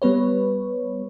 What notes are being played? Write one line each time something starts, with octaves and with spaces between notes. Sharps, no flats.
G3 B3 B4 C#5